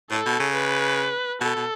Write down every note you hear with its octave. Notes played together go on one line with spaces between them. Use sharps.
A2 A4
B2
C#3
B4
B2 A4
B2